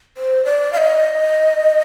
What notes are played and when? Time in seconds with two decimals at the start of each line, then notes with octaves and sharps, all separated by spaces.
0.17 C5
0.45 D5
0.73 F5
0.77 D#5